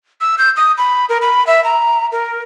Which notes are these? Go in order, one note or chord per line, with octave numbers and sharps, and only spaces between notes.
E6
G6
D#6
B5
A#4
B5
E5
A#5
A#4